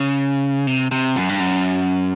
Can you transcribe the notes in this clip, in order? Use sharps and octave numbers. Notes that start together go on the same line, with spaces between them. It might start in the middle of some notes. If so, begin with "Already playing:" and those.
Already playing: C#3
C3
C3
F#2
G2
F#2